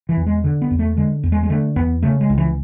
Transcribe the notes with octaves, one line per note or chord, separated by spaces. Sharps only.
E3
E2
G#3
D3
B3
E2
A3
D3 G#3
E2
G#3
G#3
D3 A3
E2 B3
C#3 A3
G#3
C#2
E3